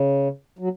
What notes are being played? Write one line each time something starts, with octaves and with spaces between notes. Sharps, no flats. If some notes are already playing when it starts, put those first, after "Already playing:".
Already playing: C#3
F#3